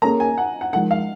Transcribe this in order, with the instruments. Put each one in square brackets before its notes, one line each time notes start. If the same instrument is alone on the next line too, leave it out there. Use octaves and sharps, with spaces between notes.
[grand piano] A#3 C#4 G#4 [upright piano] A#5
[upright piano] G#5
F#5
F#5
[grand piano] F3 G#3 D#4 A#4 [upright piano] F#5
[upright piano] F5